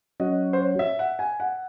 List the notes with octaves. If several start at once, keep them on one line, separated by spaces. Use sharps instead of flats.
F#3 C#4 F#4 D#5
C5
C#5
E5
F#5
G#5
F#5